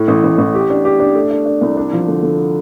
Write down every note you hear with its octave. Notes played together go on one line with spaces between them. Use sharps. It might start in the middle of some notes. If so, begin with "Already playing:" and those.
Already playing: A2
A1
A1
A1
G4
D4
G4
D4
A3
D4
D4
C2
D4
F3
D3
D3